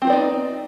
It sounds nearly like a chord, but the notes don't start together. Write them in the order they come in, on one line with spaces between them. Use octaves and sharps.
C4 F4 B3 D5 D#4